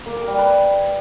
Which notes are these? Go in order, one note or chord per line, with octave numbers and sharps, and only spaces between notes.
A#3
A#4
G3
B4